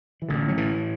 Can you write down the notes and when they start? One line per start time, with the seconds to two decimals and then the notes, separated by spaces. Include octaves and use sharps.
0.22 E3
0.29 A1 D3
0.48 F#3
0.57 A2 E3